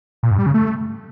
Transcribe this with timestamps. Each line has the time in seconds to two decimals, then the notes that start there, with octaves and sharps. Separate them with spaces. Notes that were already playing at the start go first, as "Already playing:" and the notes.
0.23 A#2
0.31 G2
0.39 G3
0.46 C#3
0.54 A3